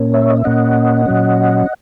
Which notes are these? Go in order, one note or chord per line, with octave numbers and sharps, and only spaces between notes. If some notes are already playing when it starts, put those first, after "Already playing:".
Already playing: A#2 A#3 C#4
C#5 E5
D#5
E5
A#2 A#3 C#4 D#5 F#5
A#2 F#3 C#4